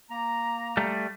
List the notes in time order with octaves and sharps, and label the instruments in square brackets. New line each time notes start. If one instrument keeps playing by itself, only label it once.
[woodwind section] A#3 A#5
[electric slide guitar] G3 A3